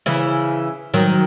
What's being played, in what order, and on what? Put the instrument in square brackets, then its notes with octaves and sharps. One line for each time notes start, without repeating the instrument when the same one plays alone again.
[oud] C#3 E3
D#3 F#3